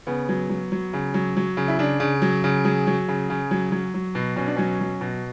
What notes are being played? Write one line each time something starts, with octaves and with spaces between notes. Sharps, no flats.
C#3 B3
F#3
F#3
F#3
C#3
F#3
F#3
C#3
E4
C#3 D4
C#3
F#3
C#3
F#3 G#4
F#3
C#3
C#3
F#3
F#3
F#3
B2
B2 C#4
D4
F#3 C#4
F#3
B2